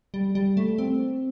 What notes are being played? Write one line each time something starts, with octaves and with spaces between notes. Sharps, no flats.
G3
G3
A3
C4